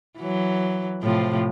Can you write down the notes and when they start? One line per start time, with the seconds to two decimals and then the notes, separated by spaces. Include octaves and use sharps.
0.19 E3 F#3
1.03 A2 C3 F3